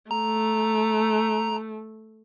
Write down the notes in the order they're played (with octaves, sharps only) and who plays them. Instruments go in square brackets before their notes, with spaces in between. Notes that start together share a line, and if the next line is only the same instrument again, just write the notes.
[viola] A3 [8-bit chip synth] A#5